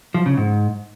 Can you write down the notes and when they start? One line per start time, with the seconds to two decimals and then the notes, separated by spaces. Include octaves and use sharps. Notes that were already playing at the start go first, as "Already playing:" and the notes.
0.14 F3
0.26 C#3
0.37 G#2